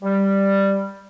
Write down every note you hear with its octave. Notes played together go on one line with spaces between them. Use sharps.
G3